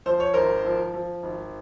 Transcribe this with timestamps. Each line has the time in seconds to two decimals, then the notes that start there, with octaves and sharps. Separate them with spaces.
0.06 F3 C5
0.20 C#5
0.34 G#1 A#4 C5
0.65 F3
0.94 F3
1.23 G#1